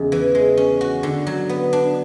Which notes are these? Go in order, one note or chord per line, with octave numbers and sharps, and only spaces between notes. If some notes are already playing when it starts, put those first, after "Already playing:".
Already playing: E2 C#3 G#3
E3
G#3
C#4
F#4
D3
F#3
B3
D4